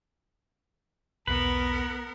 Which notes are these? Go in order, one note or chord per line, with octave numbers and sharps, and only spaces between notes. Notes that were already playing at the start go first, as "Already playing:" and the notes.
B1 E2 B3 A#4 B4